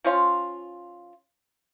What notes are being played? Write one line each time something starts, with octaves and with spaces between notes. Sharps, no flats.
F3 C#4 F4